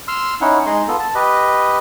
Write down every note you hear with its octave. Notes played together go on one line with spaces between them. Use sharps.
C6 E6 F6
C#4 D#4 E4 F#5
G#3 D#4 G#4 D#5 C6
B3 F4 A4
A5
G4 B4 D#5